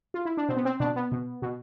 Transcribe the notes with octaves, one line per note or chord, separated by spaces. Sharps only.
F4
E4
D4
B2 C4
B3
C4
B2 D4
B3
B2
B2